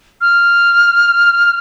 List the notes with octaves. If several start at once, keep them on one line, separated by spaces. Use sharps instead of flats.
F6